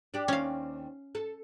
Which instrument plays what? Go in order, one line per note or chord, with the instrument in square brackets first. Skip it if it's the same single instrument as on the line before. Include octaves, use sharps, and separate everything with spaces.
[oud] D4 G4
[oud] D#2 C4 [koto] C#4 F5
[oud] A4